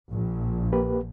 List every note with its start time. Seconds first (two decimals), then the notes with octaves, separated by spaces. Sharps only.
0.12 A#1
0.73 A#3 G4 B4